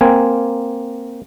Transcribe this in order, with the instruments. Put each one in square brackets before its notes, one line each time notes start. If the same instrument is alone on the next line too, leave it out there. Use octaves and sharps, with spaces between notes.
[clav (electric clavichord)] A#3 C4 G#5